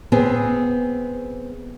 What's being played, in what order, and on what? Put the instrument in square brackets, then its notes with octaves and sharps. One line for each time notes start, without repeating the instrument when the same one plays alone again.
[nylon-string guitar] B3 C4 G#4